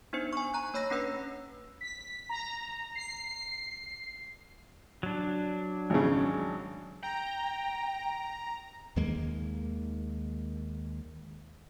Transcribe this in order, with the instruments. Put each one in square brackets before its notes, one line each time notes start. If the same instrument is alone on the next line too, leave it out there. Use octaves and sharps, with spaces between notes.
[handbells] B3 D4 D#4 C5 C#7
G#5 C#6
A#5 F#6
A#3 C#5 B5 E6 A#6
A#3 C#4 D4 B4 E6
[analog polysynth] B6
A#5
C7
[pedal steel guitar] F#3 D4
[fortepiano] G#1 C#3
[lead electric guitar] G5 [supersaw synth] A#5
[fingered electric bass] D#2 D#3 G#3 A#3